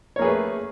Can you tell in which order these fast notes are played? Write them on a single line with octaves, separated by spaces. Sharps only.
C#5 A#3 G#4 B4 A3